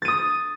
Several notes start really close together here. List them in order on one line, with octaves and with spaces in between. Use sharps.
A6 D#7 D#6